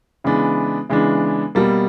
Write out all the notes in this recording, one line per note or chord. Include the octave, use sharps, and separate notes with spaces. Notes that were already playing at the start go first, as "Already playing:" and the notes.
C#3 E3 G#3 B3 D4
C#3 E3 G#3 B3 D4
B2 G3 A#3